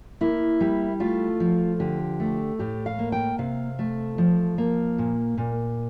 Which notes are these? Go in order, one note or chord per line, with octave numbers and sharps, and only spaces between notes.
A#3 E4
G3
A3 F4
F3
D3 G4
A3
A2 G4
F5
A#3
G5
C3 F5
A3
F3
A#3
A#2
A#2